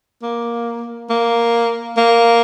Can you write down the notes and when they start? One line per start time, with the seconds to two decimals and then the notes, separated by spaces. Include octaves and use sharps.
0.22 A#3
1.10 A#3
1.97 A#3